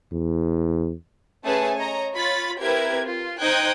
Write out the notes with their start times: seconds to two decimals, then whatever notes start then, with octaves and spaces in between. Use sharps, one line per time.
0.12 E2
1.44 A3 C#4 G#4 B4 G#5 A5
1.76 C#5 D#5 A#5
2.13 F4 C#5 B5 A6
2.61 C4 E4 G4 A#4 B4 G#6
3.03 F4
3.40 D#4 C5 G5 D#6 F#6 G#6